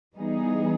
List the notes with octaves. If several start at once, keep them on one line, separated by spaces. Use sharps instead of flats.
E3 G3 B3 D#4 G#4